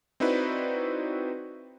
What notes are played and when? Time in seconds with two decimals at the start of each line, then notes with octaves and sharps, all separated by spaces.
0.20 C4 D#4 E4 F#4 B4 D5